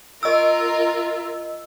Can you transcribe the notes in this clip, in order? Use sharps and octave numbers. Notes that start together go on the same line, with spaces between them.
F4 A#4 D#5 E6